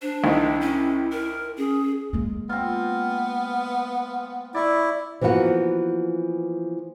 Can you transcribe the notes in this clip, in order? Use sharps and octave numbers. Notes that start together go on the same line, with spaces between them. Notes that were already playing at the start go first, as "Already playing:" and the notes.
D4 C5
C2 D#3 D#4 E4
C#4
A#4
C#4 G#4
G#3 A#3
B3 C4 F4
E4 D5 C#6
E3 F3 A#3 B3 F#4